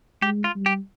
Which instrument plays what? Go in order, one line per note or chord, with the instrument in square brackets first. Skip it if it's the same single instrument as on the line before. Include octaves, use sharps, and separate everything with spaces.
[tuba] G#3 [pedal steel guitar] G4
[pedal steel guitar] F4
[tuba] G3
[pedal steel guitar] G4